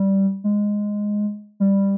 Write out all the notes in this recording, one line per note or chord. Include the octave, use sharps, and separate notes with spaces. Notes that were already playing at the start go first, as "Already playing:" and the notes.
Already playing: G3
G#3
G3